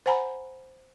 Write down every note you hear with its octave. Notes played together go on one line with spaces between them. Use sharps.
C5 F#5 G#5 A#5 B5